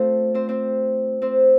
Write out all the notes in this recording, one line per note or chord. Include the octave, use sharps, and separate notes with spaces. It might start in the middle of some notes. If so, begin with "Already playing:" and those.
Already playing: A3 C4 F4 A4 C5
C4 C5
C4 C5
C4 C5